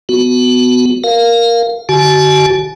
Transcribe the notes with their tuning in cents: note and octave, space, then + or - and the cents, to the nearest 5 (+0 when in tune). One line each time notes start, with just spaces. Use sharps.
B3 +20 F#4 +0
A#4 +0 F5 +0
D3 +0 F#4 +40 G#5 +40